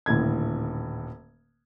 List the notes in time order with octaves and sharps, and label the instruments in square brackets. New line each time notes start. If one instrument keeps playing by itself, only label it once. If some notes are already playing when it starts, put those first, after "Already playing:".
[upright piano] D#1 A2 D3 G#6